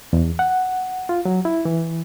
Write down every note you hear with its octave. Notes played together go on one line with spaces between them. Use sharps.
E2
F#5
F4
F#3
E4
E3